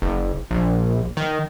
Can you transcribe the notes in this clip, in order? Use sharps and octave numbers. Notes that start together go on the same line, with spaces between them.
F#1
A#1
D#3